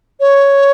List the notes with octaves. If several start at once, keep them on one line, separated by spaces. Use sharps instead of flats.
C#5